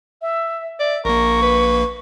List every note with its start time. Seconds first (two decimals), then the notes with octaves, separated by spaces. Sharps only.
0.22 E5
0.79 D5 E5
1.05 A#1 A#3 A#4 C#6
1.42 B4